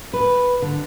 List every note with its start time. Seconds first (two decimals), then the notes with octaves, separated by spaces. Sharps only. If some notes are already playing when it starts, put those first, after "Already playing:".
0.13 B4
0.62 D3